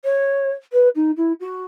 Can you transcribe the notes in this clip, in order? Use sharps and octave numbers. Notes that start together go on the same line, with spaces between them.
C#5
B4
D#4
E4
F#4